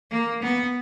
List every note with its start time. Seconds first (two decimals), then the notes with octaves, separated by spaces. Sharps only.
0.11 A#3
0.42 B3